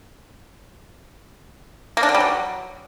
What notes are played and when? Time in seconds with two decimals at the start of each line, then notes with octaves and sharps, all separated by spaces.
1.97 A#3
2.03 D4
2.09 D3
2.15 G3
2.20 F#3